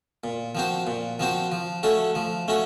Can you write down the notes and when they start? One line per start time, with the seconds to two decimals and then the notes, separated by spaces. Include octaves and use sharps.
0.24 A#2
0.55 F3 C4 F#4 C5
0.87 A#2
1.19 F3 C4 F#4 C5
1.52 F3
1.83 A3 C#4 F#4 A4
2.15 F3
2.48 A3 C#4 F#4